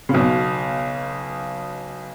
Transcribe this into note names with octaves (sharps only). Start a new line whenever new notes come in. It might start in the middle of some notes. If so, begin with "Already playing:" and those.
C#3
B1 B2